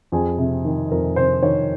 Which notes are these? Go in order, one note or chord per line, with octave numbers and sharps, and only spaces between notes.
F2 G#4
C3
D#3
F2 A#4
C3 C5
D#3 C#5